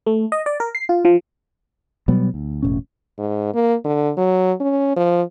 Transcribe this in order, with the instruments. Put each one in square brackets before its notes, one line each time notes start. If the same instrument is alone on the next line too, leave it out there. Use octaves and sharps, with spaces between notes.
[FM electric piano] A3
D#5
D5
A#4
C7
F4
F3
[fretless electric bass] B2 F#3 G3 B3
D2
E1 A2 C#4
[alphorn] G#2
A#3
D3
F#3
C#4
F3